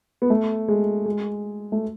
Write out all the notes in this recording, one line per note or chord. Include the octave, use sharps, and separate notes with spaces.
B3
A3
G#3
G#3
A3